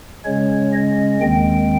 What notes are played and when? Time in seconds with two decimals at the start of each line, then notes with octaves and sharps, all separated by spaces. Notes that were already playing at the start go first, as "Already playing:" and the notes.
0.24 C#3 G#3 C#4 C#5
0.73 D#5
1.20 D#2 D#3 G#3 C4 G5